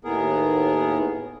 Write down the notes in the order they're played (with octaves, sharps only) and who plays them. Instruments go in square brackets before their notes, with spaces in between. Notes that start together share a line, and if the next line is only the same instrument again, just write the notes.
[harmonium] D#2 A2 B3 G#4 A#4